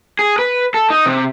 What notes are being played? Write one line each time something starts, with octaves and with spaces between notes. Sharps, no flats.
G#4
B4
A4
D#4
C3